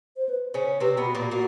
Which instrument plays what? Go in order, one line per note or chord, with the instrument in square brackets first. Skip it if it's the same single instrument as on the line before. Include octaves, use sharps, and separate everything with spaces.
[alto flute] C5
B4
[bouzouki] C#3 C#4 [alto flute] C5
[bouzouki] C3 C4 [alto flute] B4
[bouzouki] B2 B3
[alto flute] F#4
[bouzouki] A#2 A#3
[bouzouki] A#2 A#3 [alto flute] F#4